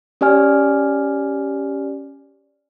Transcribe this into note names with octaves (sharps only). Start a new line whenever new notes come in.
C#4 G4 D5 G#5 F6